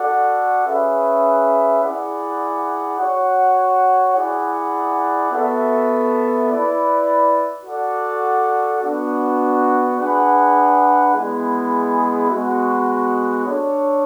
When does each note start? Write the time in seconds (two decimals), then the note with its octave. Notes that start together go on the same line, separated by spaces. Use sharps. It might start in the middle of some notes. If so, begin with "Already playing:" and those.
Already playing: F#4 A4 D5 F#5
0.67 C#4 G#4 B4 E5
1.83 E4 G#4 D5 F#5
3.00 F#4 C#5 F#5
4.16 E4 G#4 D5 F#5
5.32 B3 F#4 A4 E5
6.48 E4 B4 D5
7.64 F#4 A4 D5 F#5
8.81 B3 D4 F#4
9.97 D4 G#4 B4 F#5
11.13 G#3 B3 E4 G#4
12.30 G#3 B3 F#4
13.45 D4 A4 C#5